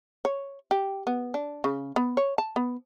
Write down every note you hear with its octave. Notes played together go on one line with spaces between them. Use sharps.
C#5
G4
B3
D4
C#3
B3
C#5
A5
B3